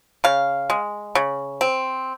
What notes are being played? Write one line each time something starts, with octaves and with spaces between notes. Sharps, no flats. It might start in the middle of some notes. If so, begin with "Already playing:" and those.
C#3 F5
G#3
C#3
C4